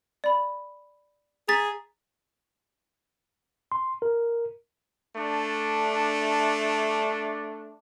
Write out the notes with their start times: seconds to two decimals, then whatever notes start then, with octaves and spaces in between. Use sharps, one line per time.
0.24 D5 B5
1.48 G#4 A#5 A6 B6
3.72 C6
4.02 A#4
5.16 A3 D4